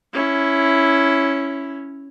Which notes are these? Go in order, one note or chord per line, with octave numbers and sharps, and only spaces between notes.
C#4 E4